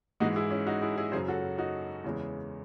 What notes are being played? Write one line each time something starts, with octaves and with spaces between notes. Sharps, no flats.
G#2 E3 G#3 D#4 F#4
E4 G#4
C#4 E4
D#4 F#4
E4 G#4
E4 G#4
F#2 C#3 F#3 G#4 C5
F#4 A4
D#4 F#4
E2 C#3 E3 G#3